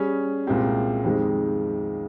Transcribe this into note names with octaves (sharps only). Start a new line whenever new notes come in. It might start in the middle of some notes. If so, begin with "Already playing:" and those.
Already playing: G3 C#4 G#4
C2 A#2 G#3 C4 G4
F2 D#3 G#3 C4 G4